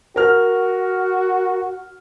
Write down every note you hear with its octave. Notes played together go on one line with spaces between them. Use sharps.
F#4 A#4 F6